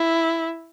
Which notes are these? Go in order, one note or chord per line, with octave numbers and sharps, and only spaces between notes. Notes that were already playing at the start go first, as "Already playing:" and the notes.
Already playing: E4